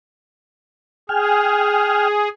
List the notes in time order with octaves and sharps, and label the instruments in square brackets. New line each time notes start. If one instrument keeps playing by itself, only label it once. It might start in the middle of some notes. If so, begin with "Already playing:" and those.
[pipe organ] G#4 [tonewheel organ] G5 G#5 F6